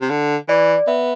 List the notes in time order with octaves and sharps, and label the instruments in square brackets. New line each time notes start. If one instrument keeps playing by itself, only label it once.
[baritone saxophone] C3
D3
[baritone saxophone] E3 [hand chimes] D5
[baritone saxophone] B3 [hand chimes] E5